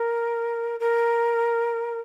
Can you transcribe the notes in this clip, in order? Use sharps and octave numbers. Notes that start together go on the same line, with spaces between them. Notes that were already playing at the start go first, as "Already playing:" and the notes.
Already playing: A#4
A#4